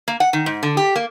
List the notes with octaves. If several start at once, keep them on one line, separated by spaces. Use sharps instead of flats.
A#3
F#5
D#3
G#2
D3
G4
A#3